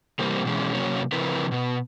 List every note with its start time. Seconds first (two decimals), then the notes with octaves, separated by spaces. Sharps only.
0.19 C3 E3 G3 A#3 C4
0.45 B2 E3 G#3 C#4
0.74 C3 F#3 A#3 C#4 F#4 C#5
1.12 C#3 F3 C4 E4 A#4 B4
1.52 B2 B3